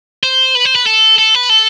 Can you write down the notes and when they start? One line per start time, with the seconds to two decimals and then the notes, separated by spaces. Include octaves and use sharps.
0.23 C5
0.55 B4
0.65 C5
0.75 B4
0.86 A4
1.18 A4
1.35 B4
1.49 A4